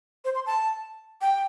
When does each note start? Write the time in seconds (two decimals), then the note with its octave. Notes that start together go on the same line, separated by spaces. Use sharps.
0.25 C5
0.35 C6
0.46 A5
1.21 G5